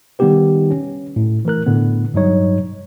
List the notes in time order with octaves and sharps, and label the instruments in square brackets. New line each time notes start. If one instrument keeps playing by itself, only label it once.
[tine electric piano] D#3 G3 B3 D#4 G4 B4
C#4
A2
E3 A3 A#4 F#6
A2 D3 B3
G2 F#3 G3 D#4 C#5